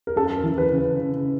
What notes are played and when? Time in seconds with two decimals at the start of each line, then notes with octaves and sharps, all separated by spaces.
0.07 A#4
0.16 F#2 A4
0.37 A#4
0.43 E3
0.58 B4
0.72 C#3
0.78 B4
0.98 C#3